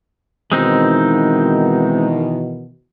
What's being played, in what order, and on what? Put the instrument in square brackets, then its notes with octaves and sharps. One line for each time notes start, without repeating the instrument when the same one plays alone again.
[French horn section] B2 D#3 E3 [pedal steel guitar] G#3 C4 D#4